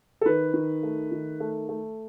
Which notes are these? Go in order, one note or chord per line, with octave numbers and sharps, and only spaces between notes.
A4
D#3 B4
D#3
A3
D#3
A3
A3